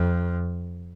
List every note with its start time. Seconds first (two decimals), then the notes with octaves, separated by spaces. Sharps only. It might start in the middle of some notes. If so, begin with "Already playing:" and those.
Already playing: F2